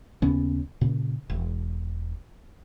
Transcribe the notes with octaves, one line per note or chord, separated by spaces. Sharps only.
D#2 C#3 B3 C#4
A#2 C#3
E1